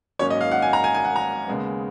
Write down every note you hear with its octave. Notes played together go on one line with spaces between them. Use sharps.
G#1 G#2 F#3 A#3 C#4 C#5
D#5
F5
F#5
G#5
A#5
G#5
G#5
F#5
A#5
D#2 C#3 G#3 B3